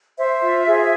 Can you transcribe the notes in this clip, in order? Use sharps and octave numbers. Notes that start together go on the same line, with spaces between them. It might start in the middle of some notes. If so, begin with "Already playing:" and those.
C5 E5
F4
G#4